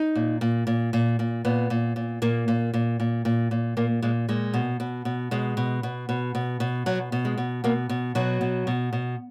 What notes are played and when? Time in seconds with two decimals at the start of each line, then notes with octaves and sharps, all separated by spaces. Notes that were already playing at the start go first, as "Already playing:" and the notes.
Already playing: D#4
0.16 A#2
0.41 A#2
0.67 A#2
0.93 A#2
1.19 A#2
1.45 A#2 B3
1.70 A#2
1.96 A#2
2.22 A#2 A#3
2.48 A#2
2.74 A#2
3.00 A#2
3.25 A#2
3.51 A#2
3.77 A#2 A#3
4.02 A#2 G#3
4.28 A#2 G#3
4.54 B2
4.80 B2
5.05 B2
5.31 B2 G#3
5.57 B2
5.83 B2
6.09 B2
6.35 B2
6.60 B2
6.86 B2 F#3
7.12 B2
7.25 G#3
7.37 B2
7.64 B2 A#3
7.89 B2
8.15 B2 F#3
8.41 B2
8.67 B2
8.93 B2